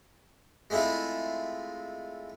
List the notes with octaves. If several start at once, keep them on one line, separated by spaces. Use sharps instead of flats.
G#3 A3 C4 E4 F4